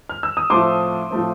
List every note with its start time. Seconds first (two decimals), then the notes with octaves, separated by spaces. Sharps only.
0.09 F6
0.23 E6
0.37 D#6
0.50 A2 F3 A3 C4 C6 D6
1.11 A2 F3 A3 C4